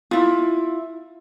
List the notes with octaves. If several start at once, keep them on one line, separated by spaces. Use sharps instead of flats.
E4 F4